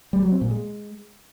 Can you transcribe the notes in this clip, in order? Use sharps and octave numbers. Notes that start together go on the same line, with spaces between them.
G3
F#3
C4
A#2
G#3